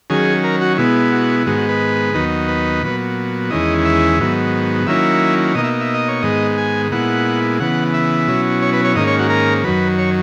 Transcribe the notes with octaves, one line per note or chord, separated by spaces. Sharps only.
D#3 F#3 C#4 G#4
A#4
F#4
B2 G#3 B3 E4
F#4
G#2 D#3 G#3 B3 F#4
F#4
B4
D#2 D#3 F#3 B3 D#4
B4
A#2 F#3 B3
E2 D#3 G#3 C#4 E4 D#5
E5
G#2 D#3 F#3 B3
D#3 F#3 A#3 C#4 E4 E5
B2 A#3 D#4 D#5
E5
E5
D#5
C#5
G#2 D#3 G#3 B3 D#5
G#5
A#2 G#3 B3 E4 F#5
C#3 E3 B3 F#5
E5
B2 F#3 C#4 E4
C#5
B4
C#5
G#2 D#3 A#3 C#4 D#5
C#5
F#4
A#4
F#2 D#3 F#3 B4
C#5